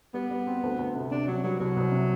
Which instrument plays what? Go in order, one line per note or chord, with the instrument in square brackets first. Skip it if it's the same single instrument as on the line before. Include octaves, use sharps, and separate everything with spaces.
[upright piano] G3 [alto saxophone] B3
[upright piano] G3
C4
D2
D2
C3
[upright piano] C3 [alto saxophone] D4
[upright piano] C3 [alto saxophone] F#3
[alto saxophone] F#3 [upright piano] G3
[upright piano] C2 [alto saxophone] F#3
[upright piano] C2
C3